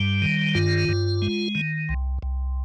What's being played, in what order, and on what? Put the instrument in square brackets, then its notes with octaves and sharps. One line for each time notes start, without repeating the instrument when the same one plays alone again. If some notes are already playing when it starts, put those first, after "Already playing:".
Already playing: [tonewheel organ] G2 G3
D#3
G2 F4
G2
G#3
D#3
C2
C2